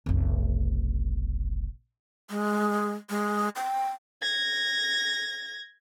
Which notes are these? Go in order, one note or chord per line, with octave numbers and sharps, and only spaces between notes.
F1 B1
G#3
G#3
G5
G#6 A#6